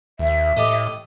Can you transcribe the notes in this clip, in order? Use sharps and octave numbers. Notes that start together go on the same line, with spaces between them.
D#2 E5
A2 G4 A4 D#5